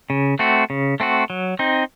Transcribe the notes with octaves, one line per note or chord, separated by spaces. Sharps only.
C#3
A3 C4 F#4
C#3
A3 C4 F#4
F#3
C4 D#4